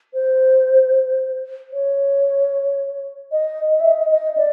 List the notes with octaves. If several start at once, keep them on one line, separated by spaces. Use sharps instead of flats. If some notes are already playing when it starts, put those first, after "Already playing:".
C5
C#5
D#5
D#5
E5
D#5
D#5
D5